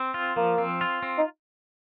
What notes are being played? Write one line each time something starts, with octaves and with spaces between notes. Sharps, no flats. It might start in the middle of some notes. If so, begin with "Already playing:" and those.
Already playing: C4
F4
F3 A#3
C4
F4
C4
D#4